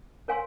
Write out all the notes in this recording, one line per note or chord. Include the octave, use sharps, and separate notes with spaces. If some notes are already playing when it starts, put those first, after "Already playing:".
A#4 C#5 F5 G#5 C6